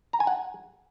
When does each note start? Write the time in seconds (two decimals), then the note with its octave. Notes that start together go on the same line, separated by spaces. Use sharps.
0.13 A#5
0.20 G#5
0.27 F#5